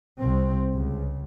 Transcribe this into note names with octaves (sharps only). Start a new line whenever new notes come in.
C2 C4
C#2